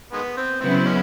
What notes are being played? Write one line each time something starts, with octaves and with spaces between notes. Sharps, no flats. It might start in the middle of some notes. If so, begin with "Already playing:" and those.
D#3 G#3 B3
C4
C#3 F#3 B3 C4 E4
C4
G#3 C#4